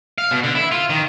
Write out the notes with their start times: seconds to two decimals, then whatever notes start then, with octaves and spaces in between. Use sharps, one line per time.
0.18 F5
0.31 B2
0.43 D3
0.55 E4
0.72 F4
0.90 D#3